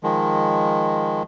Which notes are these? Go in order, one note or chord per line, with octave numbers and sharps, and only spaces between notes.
D#3 F3 G#3